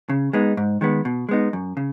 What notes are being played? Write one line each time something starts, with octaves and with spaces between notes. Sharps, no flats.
C#3
G#3 B3 D#4
G#2
D#3 G#3 B3
B2
G#3 B3 D#4
F#2
C#3